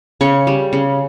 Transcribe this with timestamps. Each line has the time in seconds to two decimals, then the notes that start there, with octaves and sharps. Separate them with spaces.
0.21 C#3 C#5
0.47 G3
0.73 C#3